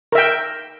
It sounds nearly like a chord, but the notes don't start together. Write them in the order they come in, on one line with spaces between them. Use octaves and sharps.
A#4 E5 G5